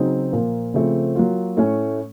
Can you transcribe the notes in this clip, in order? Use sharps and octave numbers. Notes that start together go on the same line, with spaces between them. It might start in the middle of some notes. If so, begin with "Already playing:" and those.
Already playing: C#3 F#3 C4 D#4
A#2 F3 A#3 F4
C#3 F3 A3 C4
F#3 A#3 F4
A2 A3 C#4